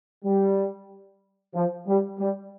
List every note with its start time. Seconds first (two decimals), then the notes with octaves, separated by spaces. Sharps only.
0.25 G3
1.54 F3
1.87 G3
2.18 G3